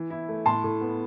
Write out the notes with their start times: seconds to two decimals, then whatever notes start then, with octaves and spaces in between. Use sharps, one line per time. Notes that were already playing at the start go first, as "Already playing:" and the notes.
Already playing: E3
0.10 E4
0.29 A3
0.46 A2 A5 C6
0.64 A2
0.81 B3